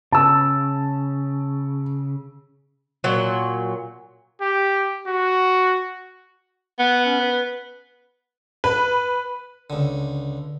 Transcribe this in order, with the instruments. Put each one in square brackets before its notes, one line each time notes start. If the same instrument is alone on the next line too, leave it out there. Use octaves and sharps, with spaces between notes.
[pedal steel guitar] C#3 [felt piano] A5 E6
[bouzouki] A#2 F#3
[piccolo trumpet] G4
F#4
[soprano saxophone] B3 [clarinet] F#5
[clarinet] C#4
B4
[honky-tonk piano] B4
[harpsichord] C#2 D3